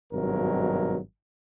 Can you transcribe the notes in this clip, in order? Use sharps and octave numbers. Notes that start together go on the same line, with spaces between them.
G#1 G2 B2 F#3 A#4